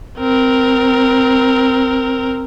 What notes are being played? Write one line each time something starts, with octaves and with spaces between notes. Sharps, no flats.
C4 A#4